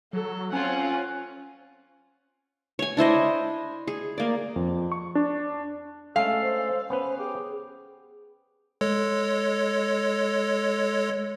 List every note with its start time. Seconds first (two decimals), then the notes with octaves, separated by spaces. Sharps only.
0.13 F#3 A4
0.52 C4 C#4 F4 F#5 G#5
2.79 C#5 G#5
2.97 D4 E4 C5 D#5
3.87 G#4
4.18 A#3 D5
4.56 F2
4.92 C#6
5.15 D4
6.16 G#3 A3 C#4 A4 F5
6.42 C5
6.90 B3 C#4 B4 C5
7.19 G4 G#4
8.81 G#3 A4 C#5